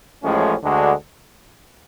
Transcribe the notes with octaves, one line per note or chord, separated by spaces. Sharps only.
A1 A2 F3 G#3 C#4
D2 D3 G#3 D4 F#4